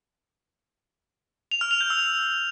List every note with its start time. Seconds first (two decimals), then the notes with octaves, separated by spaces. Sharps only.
1.51 F7
1.61 F6
1.71 F7
1.81 G6
1.90 E6